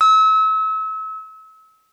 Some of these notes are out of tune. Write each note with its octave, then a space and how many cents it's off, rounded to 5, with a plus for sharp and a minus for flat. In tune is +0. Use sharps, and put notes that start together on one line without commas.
E6 -35